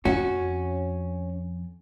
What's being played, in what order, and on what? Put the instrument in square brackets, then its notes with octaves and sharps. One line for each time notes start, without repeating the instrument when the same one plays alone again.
[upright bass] F2 [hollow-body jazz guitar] C#4 F#4